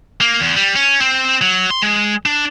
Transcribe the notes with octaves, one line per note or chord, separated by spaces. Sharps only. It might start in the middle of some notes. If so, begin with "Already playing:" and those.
A#3
E2
G3
C#4
C4
F#3
C6
G#3
D4